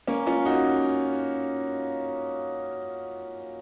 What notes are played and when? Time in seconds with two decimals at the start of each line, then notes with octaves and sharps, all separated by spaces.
0.08 A#3 C#4
0.26 C#4 F4
0.45 D#4 F#4